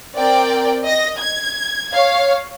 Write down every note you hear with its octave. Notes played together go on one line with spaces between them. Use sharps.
C4 A#4 D5 G5
D#5 A#6
G#6
C#5 F5